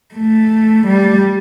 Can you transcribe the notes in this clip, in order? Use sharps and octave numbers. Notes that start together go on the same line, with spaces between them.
A3
G3